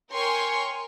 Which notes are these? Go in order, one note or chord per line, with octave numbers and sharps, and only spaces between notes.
A#4 C#5 G5 G#5 C6 C#6